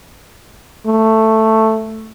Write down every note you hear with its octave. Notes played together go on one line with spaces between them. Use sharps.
A3